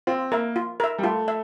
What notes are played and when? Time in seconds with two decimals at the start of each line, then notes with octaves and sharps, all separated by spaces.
0.07 C4 F4
0.32 A#3 A#4 E5
0.56 F4
0.80 A#4 E5
0.98 G3
1.04 A3 F4
1.28 E5